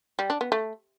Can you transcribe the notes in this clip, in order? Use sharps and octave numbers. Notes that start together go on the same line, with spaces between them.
G3
D4
B3
A3